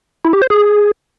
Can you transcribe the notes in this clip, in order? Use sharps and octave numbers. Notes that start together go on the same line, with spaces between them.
E4
G4
C5
G#4